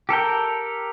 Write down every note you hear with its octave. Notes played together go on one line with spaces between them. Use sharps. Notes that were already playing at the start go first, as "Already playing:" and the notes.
G4 A4 A#4 G5